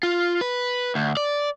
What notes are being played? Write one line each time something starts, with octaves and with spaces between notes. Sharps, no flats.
F4
B4
D2
D5